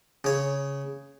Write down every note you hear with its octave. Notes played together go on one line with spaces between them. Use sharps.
C#3 C#5